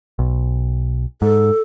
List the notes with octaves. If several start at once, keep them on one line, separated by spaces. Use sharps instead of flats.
B1
G#2 A4